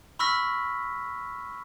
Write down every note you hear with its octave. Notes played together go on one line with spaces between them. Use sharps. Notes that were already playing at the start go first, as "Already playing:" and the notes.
B5 C#6 E6 F6 A#6 B6